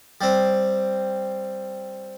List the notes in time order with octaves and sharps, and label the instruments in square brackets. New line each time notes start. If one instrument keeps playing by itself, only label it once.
[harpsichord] G3 C4